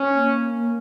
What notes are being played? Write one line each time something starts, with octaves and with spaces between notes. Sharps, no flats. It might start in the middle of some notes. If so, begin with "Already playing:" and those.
Already playing: C#4
A#3